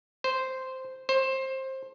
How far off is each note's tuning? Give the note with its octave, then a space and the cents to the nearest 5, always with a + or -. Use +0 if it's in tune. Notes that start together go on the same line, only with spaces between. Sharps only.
C5 -5
C5 +20